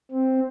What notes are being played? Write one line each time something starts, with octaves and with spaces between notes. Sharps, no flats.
C4